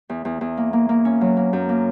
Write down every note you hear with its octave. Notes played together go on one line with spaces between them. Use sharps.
E2
E2
E2
A#3
A#3
A#3
C#4
F#3
A#3
F#2
A#3